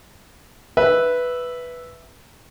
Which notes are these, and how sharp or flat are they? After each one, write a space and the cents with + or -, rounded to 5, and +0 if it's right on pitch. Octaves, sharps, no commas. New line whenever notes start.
B4 +0 E5 +0